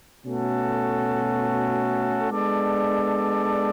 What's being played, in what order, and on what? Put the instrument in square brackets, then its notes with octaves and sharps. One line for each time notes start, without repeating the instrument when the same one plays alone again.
[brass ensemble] B2 A3 C#4 F#4 A4
G#3 B3 D4 A4 D5